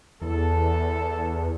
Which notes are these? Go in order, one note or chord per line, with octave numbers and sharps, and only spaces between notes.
E2 A4